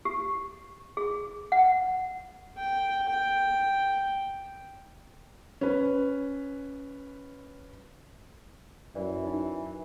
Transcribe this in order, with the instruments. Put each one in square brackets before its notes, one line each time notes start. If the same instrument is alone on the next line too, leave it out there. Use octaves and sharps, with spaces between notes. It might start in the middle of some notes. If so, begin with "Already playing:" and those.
[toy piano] G4
G#4
F#5
[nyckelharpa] G5
G5
[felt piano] C#4 B4
[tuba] F#2 [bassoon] E3 [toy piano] D5
[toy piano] D#4